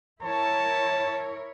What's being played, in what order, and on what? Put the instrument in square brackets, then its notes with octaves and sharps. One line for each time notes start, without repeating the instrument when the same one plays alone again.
[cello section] E4 A#4 C#5 [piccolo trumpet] A5